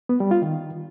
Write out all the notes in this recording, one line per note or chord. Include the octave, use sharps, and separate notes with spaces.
B3
G3
F4
D#3